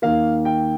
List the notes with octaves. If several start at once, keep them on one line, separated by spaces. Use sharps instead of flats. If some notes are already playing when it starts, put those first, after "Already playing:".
D#2 D#3 A#3 F5
G5